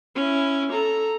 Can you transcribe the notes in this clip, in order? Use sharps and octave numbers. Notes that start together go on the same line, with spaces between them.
C#4 E4
A4 A#5